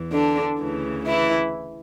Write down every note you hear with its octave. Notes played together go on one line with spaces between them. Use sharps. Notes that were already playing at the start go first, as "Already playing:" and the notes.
Already playing: E2 E3
D3 D4
D2 C#3 E3
E3 E4